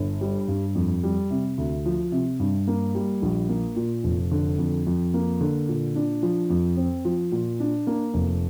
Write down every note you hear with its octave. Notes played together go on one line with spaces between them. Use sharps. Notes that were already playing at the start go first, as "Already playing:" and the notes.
Already playing: G1
G3
G2
F2
G3
C3
D2
F3
C3
G2
A#3
G3
A#1
A#3
A#2
F1
D3
F2
F2
A#3
D3
A#2
D4
F3
F2
C4
F3
A#2
D4
A#3
F1